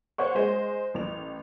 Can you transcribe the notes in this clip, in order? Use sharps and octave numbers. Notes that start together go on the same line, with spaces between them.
C5 C#5 F#5 C#6
G#3 C5 D#5
A1 F7